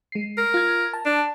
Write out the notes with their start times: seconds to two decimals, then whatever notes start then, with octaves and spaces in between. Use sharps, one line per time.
0.12 G#3 C7
0.38 A#4
0.54 F4 G#6
0.93 A5
1.06 D4